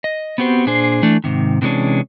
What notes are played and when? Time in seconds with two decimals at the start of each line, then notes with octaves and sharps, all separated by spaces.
0.04 D#5
0.38 B3 C4 F#4 G4 C5
0.66 A#2 D4 G#4 C5
1.03 E3 A3 D4
1.24 G#2 C3 D#3
1.62 C3 E3 G#3 C#4 D4